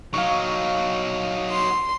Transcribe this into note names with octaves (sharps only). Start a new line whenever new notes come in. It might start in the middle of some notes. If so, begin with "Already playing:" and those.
F#3 D#4 F5 C#6
C6